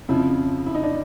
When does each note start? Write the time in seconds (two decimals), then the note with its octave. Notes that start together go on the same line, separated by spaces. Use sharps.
0.08 F2 C#3 F3 E4
0.66 E4
0.75 D#4
0.83 D4